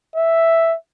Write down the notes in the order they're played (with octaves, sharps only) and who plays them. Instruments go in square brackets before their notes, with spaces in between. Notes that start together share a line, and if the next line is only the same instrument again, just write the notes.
[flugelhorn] E5